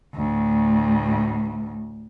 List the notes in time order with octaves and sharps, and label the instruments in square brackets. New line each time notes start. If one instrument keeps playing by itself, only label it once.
[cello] D2 A2